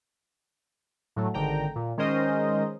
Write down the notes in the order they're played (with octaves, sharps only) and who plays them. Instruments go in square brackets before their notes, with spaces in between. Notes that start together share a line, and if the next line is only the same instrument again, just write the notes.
[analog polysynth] A2 F#3 A3
G#1 D3 D#3 G5 A#5
A#2
D#3 G#3 C#4 A#4 C5 D#5